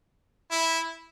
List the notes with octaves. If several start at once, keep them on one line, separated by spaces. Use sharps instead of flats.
E4